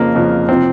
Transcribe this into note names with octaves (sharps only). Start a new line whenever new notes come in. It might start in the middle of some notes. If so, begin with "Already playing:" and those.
Already playing: F2 C#3 F3 A#3
F2 C#3 F3
C3 F3 C4